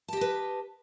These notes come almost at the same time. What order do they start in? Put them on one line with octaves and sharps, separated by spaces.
A5 G4 D#5 B4